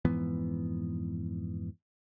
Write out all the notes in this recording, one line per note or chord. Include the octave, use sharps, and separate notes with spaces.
F2 G#2 E3 B3